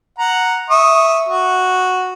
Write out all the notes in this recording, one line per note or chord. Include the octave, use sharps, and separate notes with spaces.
F#5 A#5
E5 C#6 D#6
F#4